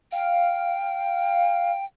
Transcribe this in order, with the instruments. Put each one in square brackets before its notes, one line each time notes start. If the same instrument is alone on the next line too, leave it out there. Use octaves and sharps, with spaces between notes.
[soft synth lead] F5 [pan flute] G5